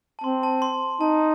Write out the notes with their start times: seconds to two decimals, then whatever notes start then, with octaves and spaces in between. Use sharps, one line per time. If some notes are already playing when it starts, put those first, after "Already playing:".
0.19 A5
0.24 C4 C6
0.43 A5
0.62 C6
1.01 D#4 A5